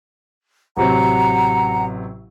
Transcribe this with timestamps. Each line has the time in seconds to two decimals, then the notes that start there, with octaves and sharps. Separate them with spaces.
0.77 A1 C3 F#3 F#5 A#5